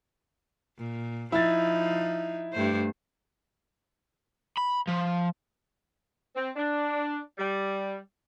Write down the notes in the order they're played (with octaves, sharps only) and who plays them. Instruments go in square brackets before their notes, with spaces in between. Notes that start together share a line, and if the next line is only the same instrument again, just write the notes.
[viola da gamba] A#2
[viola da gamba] F3 D#4 [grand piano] E4 A6
[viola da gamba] G2 A3 C5
[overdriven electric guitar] B5
F3
[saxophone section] C4
D4
G3